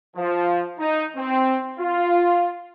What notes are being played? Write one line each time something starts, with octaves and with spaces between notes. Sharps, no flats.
F3
D#4
C4
F4